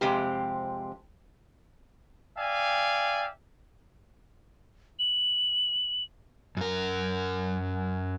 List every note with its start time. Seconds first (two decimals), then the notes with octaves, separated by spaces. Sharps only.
0.01 F2 C3 G#3 C4 G4
2.38 D5 E5 F5 G5 G#5
4.99 F#7
6.57 F#2 A#4